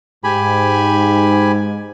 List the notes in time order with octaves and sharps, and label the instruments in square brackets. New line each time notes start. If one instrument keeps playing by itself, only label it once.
[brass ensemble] G#2 [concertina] G4 G#5 B5